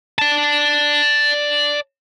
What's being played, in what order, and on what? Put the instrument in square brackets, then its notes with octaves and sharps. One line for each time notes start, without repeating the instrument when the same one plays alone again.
[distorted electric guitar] D5 A5